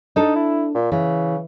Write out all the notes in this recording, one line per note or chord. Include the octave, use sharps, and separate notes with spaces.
D4 D#4 A4
E4
A#2
C#3 E3